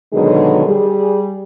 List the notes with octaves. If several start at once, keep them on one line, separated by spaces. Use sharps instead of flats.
B2 D3 D#3 F#3 G#3 G#4
G3 G#4